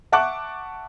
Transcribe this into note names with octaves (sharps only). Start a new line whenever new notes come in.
E5 F#5 A5 C#6 D6 F#6